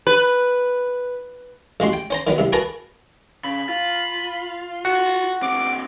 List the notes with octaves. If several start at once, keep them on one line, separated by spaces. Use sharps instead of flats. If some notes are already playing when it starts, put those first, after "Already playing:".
B4
A1 G#3 F#4 C6
G5
C#4 C5 A#5
D#3 F#3 B3
C2 C3
F#4 G#4 A#4 B4 A5 A#5
C#3 B5
F4
F#4 F#5
D3 C4 D6